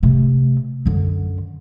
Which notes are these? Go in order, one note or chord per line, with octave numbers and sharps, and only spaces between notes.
C3 A3
F#2 D3